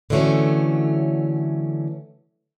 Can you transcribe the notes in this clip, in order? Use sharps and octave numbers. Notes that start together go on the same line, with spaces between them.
D3 E3 F#3 A3 C#4